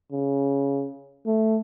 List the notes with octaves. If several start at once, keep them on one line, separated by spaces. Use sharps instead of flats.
C#3
A3